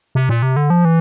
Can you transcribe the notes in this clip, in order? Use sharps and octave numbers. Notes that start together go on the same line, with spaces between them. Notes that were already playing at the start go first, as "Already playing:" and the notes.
C3
A#2
C3
D3
F3
E3